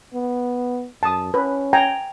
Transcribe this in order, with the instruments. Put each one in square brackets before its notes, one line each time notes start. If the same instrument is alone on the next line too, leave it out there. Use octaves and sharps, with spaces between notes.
[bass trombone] B3
[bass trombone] F#2 [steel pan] A5 D#6
[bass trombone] C#4 [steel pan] B4
[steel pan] G5 G#5 A#5